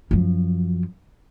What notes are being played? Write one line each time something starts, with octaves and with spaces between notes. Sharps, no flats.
F#2 F3